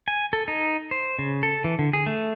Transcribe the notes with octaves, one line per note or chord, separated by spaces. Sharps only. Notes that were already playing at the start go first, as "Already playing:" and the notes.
G#5
A4
D#4
C5
C#3
A4
E3
D3
G#4
A3